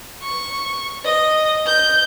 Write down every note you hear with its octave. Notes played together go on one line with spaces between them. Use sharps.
C#6
D#5
G6